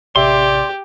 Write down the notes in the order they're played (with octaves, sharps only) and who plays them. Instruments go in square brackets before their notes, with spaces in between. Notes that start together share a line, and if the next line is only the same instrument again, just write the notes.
[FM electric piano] A1 C3 E5 [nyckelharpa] G4 [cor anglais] D5 [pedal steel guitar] C6